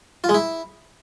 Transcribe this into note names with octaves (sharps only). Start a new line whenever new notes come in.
F4
G#3
E4